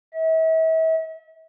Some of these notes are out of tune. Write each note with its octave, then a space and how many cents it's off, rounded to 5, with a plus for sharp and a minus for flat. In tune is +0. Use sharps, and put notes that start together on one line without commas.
E5 -40